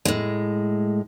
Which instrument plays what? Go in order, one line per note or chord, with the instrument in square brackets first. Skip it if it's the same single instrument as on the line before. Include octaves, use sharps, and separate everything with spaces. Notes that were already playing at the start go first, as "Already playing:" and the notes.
[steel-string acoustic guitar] A2 G#3